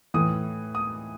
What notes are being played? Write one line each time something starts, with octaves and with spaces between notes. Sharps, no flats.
A2 E3 D#6
D#6